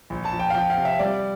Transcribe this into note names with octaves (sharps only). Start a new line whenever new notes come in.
A#1
A5
F3
G5
F5
F3 G5
F5
C3
E5
G3 D5